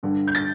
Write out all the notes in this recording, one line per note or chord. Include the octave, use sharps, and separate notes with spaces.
G2 D3
G6
A6